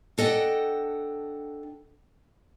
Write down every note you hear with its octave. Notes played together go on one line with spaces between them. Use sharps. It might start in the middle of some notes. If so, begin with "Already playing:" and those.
D4 A4 D#5 F#5 G5